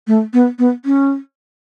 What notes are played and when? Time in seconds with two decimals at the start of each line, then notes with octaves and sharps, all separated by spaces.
0.07 A3
0.33 B3
0.59 B3
0.85 C#4